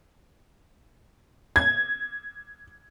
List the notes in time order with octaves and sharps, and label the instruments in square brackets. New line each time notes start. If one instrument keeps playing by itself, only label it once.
[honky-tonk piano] G#6